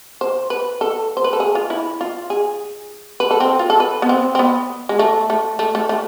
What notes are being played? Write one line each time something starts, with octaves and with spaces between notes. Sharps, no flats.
C5
B4
A4
C5
B4
A4
G#4
F4
E4
F4
G#4
B4
A4
C4
F4
A4
B4
B3
C4
C4
B3
G#3
A3
A3
A3
A3
A3